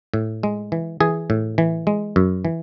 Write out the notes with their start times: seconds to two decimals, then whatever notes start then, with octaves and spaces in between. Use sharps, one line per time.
0.14 A2
0.43 G#3
0.72 E3
1.00 E3 G#4
1.30 A2
1.58 E3
1.87 G#3
2.16 F#2
2.45 E3